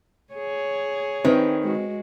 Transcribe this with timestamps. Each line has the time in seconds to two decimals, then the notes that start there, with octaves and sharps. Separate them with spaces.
0.33 G#4 C#5
1.25 D#3 C4 B4
1.63 G#3 F#4